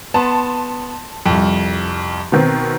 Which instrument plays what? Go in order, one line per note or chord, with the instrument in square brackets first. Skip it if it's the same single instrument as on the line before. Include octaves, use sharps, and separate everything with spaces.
[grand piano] B3 [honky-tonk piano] A5 C6
[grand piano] C2 F2
[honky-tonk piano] B2 D#3 C4